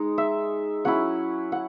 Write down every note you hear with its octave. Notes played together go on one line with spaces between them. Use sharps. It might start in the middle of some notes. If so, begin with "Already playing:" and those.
Already playing: G#3 D#4
E5
F#3 C#4 E4 F#5
F#5